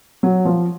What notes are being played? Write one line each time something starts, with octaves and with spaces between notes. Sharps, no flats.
F#3
F3